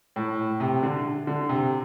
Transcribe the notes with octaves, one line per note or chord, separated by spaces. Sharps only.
A2
C3
D3
D3
C3